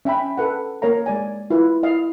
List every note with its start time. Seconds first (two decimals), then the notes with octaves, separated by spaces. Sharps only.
0.05 C#4 E5 G5 B5
0.38 A4 B4 F#5
0.82 A#3 A#4 C#5 F5 A#5
1.06 G#3 D5 G#5
1.50 E4 F4 B4
1.83 E4 D#5 F5